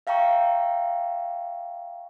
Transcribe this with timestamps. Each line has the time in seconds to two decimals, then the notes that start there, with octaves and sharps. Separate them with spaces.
0.07 E5 F5 G5 A#5 C#6